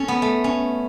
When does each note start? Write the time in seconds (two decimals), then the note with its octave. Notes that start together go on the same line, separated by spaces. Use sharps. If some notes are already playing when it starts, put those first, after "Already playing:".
Already playing: C#4 A4
0.08 B3
0.22 A3
0.44 C#4